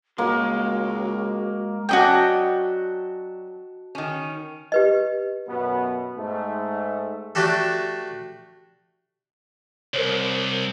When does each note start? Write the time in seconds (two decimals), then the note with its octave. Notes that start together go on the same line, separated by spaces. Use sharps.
0.18 C#2 G#3 A#3 F#4 C6
1.89 F#3 C#4 D4 F#4 D#5 G5
3.95 D#3 C#4
4.72 G4 B4 D#5
5.48 F#2 B2 B3
6.17 G#2 A3
7.35 A3 D4 F#4 G4 A4
9.94 C2 A#4 C5 C#5